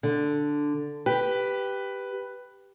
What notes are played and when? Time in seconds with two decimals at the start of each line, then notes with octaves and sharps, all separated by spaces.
0.03 D3
1.06 G4 B4